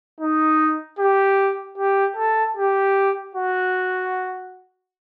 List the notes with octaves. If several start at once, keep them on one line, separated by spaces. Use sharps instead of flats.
D#4
G4
G4
A4
G4
F#4